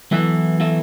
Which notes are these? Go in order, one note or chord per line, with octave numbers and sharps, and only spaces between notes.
E3 F#3 B3 E4 A4 E5
F#3 B3 E4 A4 E5